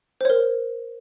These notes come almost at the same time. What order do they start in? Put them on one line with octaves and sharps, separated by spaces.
C5 C#5 A#4